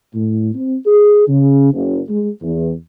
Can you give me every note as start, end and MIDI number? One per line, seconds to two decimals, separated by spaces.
0.15 0.49 45
0.55 0.75 60
0.86 1.27 68
1.28 1.72 49
1.73 1.99 30
2.08 2.31 56
2.42 2.71 40